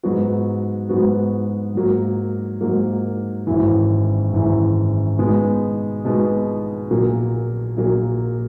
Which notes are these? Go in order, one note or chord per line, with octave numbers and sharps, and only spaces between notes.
G#2 F#3 B3 F#4
G#2 F#3 B3 F#4
G#2 F#3 A#3
G#2 F#3 A#3
G#1 F#2 E3
G#1 F#2 E3
B2 G#3 B3 D#4
B2 G#3 B3 D#4
A#1 A#2 F#3 A#3
A#1 A#2 F#3 A#3